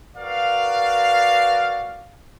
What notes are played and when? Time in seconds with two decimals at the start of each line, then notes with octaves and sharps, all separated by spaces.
0.17 F#4 A#4 B4 D5 F5